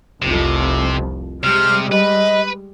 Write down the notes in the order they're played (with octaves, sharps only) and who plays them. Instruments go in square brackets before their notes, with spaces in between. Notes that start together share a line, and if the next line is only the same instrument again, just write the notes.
[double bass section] F1 C2 F2 [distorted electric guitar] C3
[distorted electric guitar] C3 [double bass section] G3 G#3 [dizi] F6
[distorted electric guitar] B4 [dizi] D#5